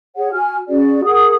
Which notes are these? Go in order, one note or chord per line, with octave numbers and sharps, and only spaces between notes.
G#4 C#5 F#5
F#4 G#5 F6
C#4 F#4 G#4 D5
G#4 A#4 F#5 D#6